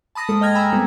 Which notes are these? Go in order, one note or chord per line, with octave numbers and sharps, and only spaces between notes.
A5 B5 D#6 A#6
G#2 G#3 A#3 A4 D#6
D#5 G5 F6 G#6 A#6
G5 G#5 A#5 B5 E6
G3 B3 C4 A4